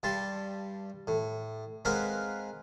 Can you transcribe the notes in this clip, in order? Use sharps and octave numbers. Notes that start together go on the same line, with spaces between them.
G2 G3 A5 C6
A2
G#3 C4 A#4 B4 F5 F#5